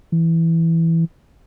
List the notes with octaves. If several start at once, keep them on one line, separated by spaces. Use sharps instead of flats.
E3